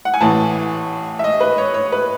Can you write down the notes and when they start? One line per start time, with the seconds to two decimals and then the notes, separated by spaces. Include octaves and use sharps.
0.05 F#5
0.14 G#5
0.21 A1 A2 E3 A5
1.19 E5
1.24 D#5
1.40 B4
1.58 C#5
1.74 C#5
1.92 B4